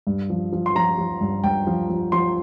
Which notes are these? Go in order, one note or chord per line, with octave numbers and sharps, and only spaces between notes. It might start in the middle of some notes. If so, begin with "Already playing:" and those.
G2
F3
F3
C6
F3 A#5
F3
G2
G2 G5
F3
F3
F3 C6